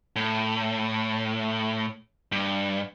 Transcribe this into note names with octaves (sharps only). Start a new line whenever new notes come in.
A2
G2